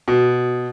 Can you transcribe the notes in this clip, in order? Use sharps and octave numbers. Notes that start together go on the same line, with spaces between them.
B2